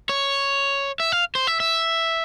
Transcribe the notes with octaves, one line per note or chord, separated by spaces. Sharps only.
C#5
E5
F5
C5
E5
E5